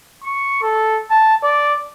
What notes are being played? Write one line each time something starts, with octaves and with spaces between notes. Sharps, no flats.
C#6
A4
A5
D5